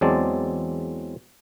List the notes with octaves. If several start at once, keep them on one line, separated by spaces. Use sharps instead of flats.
E2 F#3 G#3 C4 D5 A5